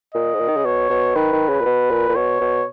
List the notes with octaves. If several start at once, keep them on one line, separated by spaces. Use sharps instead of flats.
A#2 D#5
G#2
A#2
D#3
C#3
B2 C#5
B2
D#3 B4
D#3
C#3
A#2
B2
A#2
A#2
B2 C#5
B2